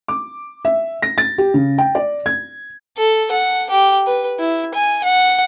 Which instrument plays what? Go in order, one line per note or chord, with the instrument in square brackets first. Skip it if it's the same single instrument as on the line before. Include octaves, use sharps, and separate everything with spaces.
[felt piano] D6
E5
A#6
A6
G4
C#3
G5
D5
G#6
[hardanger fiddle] A4
F#5
G4
B4
E4
G#5
F#5